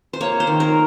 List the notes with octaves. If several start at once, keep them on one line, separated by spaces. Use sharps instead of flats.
C5
A#3 C#5
C5
D#3
A#4